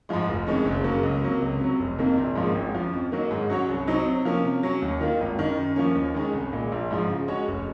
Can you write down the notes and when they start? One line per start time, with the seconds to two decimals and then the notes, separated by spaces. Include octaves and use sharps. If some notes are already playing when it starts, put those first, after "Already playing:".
0.09 G#2 F3 G#3
0.28 F1
0.47 F2 D#3 G#3 C#4
0.65 F#1
0.84 F#2 C#3 F#3 A#3
1.03 C#2
1.23 C3 F#3 A#3
1.42 C#2
1.60 C3 F#3
1.79 F1
1.99 F2 C3 D#3 A#3
2.17 A#1
2.35 G#2 F3 A#3 C#4
2.55 G#1
2.74 F#2 F3
2.93 F2
3.12 D#3 F#3 A#3
3.31 G#2
3.49 F#3 C#4 F#4 C#5
3.69 C2
3.87 C3 F#3 C4 D#4
4.06 C3
4.25 F3 A#3 C#4
4.44 C3
4.63 F#3 C#4
4.82 D#2
5.01 D#3 A#3 F4
5.21 G#1
5.39 F#2 D#3
5.57 F#2
5.76 F3 A#3 C#4
5.95 D#2
6.14 D#3 G#3 C#4
6.33 C2
6.53 A#2 G#3
6.72 A#1
6.91 G#2 F3
7.09 C#3
7.28 G#3 C#4 F#4 C#5
7.48 F1